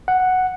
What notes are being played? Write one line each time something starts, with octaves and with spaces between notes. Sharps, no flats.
F#5